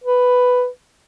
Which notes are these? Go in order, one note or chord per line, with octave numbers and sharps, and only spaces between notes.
B4